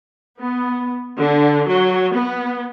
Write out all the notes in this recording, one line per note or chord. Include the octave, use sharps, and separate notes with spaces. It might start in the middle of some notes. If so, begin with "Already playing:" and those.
B3
D3
F#3
B3